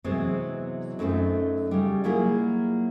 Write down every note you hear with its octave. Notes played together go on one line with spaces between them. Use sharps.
C3 E3 F#3 G#3 B3 C4
F#2 A3 C4 D#4 F4
C#3 G3
F#3 A#3 E4 F4 G#4